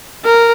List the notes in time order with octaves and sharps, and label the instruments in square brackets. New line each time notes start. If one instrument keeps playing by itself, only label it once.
[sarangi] A#4